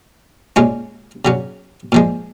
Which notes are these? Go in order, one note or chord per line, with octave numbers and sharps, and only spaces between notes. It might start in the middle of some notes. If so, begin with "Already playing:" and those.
A#2 G#3 C#4 F4
C#3 F#3 C#4
A#2 F3 G#3